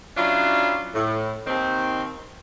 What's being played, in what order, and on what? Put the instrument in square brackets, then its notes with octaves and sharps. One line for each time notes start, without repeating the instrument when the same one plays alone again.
[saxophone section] F#3 C#4 D4 E4 F4
A2
D#2 D#3 C4